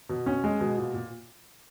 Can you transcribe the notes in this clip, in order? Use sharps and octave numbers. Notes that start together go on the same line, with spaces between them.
B2
C#4
G#3
B2
A#2
A#2